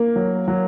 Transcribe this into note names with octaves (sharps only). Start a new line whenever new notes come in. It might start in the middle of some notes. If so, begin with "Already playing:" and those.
Already playing: A#3
F#3
F#3